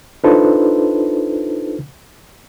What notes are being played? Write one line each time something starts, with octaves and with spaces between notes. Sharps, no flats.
D4 D#4 F4 A4 B4 C5